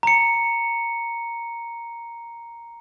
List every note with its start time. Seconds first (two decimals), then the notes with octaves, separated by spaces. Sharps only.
0.03 A#5 C#7